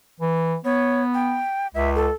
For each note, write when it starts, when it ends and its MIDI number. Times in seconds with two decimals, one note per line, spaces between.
0.20 0.56 52
0.65 1.41 59
0.65 1.02 73
1.14 1.67 79
1.75 2.08 37
1.75 1.91 76
1.95 2.13 69